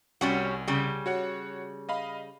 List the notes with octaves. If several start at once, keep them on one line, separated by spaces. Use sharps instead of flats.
C2 G3 C#4 F#4
C#3 G3
F#4 C#5 F#5
D#5 F5 B5